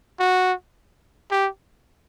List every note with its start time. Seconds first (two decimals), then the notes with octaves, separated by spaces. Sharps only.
0.20 F#4
1.31 G4